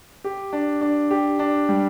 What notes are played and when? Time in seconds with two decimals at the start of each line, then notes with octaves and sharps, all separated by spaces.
0.24 G4
0.53 D4
0.81 D4
1.11 G4
1.39 D4
1.69 G3